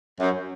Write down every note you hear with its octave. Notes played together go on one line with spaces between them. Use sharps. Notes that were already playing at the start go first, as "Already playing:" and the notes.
F#2